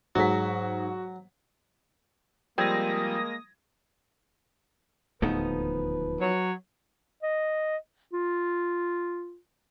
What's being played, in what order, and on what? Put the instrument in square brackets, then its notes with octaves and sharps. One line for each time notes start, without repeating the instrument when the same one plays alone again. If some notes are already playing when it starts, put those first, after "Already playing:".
[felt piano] G#2 G#4 B6 [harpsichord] F#3 [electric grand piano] F#4
[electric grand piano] F3 G3 G#6 [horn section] G#3 A#3 [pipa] C4 [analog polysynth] D#6 A#6
[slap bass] D1 D#2 A3 [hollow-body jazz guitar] F3 B3 D#4 [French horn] B4
[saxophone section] F#3 C#5
[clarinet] D#5
F4